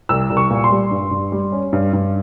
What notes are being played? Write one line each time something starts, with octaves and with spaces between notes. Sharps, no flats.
C2 E6
C2
C#6
A#2
C6
G3
G2
G2
G3
C#4
G2
G2